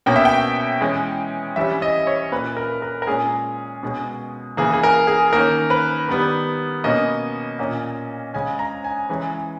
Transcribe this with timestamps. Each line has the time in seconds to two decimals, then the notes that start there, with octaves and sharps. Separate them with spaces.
0.06 B2 A#3 C#4 G5
0.16 E5
0.25 G5
0.81 E3 G#3 C#4
1.56 E3 G3 C#4 E5
1.82 D#5
2.07 C#5
2.32 A#2 A#3 C#4 B4
2.57 A#4
2.82 A#4
3.02 A#4
3.07 A#2 G#3 C#4 G#4
3.83 B2 G#3 C#4
4.57 C#3 E3 A#3 G#4
4.73 G#4
4.83 A#4
5.07 G#4
5.33 D#3 A#3 C#4 A#4
5.70 B4
6.09 D#3 G3 B3
6.84 B2 A#3 C#4 D#5
7.59 A#2 A#3 C#4
8.34 C#3 G#3 C#4 G#5
8.59 A#5
8.84 G#5
9.09 E3 G#3 C#4